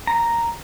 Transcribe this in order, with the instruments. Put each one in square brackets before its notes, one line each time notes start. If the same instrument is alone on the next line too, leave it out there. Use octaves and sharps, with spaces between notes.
[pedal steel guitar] A#5